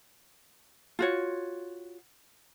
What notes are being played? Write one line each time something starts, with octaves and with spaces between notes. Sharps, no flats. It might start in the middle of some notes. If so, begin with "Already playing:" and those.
F4 F#4 C#5